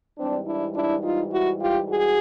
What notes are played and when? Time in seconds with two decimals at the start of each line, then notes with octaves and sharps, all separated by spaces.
0.18 G#2 E3 G3 C4 D4
0.47 D4 E4
0.75 D4 E4
1.03 D#4 F4
1.32 E4 F#4
1.60 F4 G4
1.88 F#4 G#4